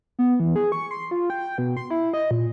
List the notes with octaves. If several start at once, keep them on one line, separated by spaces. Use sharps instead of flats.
B3
E3
G#4
C#6
C6
F4
G5
B2
C6
E4
D#5
A#2